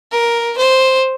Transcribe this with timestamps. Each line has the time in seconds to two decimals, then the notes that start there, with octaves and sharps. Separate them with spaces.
0.12 A#4
0.58 C5